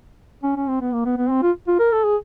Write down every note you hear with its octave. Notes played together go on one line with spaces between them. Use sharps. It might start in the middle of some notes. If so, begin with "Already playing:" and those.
C#4
C#4
C4
B3
A#3
B3
B3
C4
F4
F4
A#4
A4
G#4